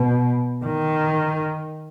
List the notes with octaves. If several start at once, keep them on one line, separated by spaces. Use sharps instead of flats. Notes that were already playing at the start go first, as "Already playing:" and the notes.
Already playing: B2
D#3